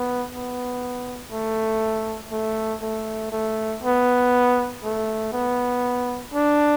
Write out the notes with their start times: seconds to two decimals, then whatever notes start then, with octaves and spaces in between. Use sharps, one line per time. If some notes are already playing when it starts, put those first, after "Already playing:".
Already playing: B3
0.31 B3
1.32 A3
2.32 A3
2.82 A3
3.32 A3
3.83 B3
4.84 A3
5.33 B3
6.34 D4